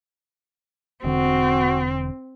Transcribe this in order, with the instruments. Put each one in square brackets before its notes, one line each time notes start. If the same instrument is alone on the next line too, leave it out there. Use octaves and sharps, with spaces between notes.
[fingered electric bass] E1 D3 [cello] C4 [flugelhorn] F#4